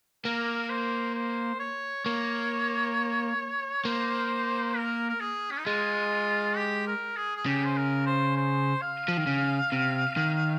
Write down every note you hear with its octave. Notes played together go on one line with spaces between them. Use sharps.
A#3 A#4
C5
C5
C#5
A#3 C#5
A#3 C5
A#4
A#4
G#4
C#4
D#4
G#3 F4
G4
A#4
G#4
G#4
C#3 G4
C5
A#4
C5
C5
F5
F3
D#3
C#3
C3
D#3